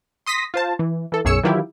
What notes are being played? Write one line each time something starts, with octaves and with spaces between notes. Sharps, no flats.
C6 D#6 A#6 B6
F4 C5 A5
E3
E3 A4
B1 F#2 G#4 C#5 E6 C#7
D#3 E3 F#3 E4 F4 G4